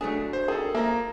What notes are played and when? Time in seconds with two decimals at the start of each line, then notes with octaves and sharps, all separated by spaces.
0.01 F#3 A3 D4 G#4
0.33 C5
0.48 D#3 G#4 A4
0.75 F3 A#3 E5 A#5